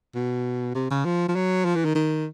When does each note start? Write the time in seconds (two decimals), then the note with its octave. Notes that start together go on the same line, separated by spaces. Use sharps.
0.15 B2
0.75 C3
0.91 C#3
1.05 F3
1.29 F3
1.35 F#3
1.65 F3
1.76 E3
1.85 D#3
1.95 D#3